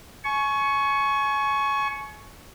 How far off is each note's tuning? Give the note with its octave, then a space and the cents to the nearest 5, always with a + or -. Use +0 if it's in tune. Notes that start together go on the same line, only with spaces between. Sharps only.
G#5 +35 C#6 +0